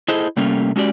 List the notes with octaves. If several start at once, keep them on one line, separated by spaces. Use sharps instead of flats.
E4 G#4 A4 C5 D#5
C3 G3 A3 A#3 C#4
G#3 C#4 F#4 G4 D5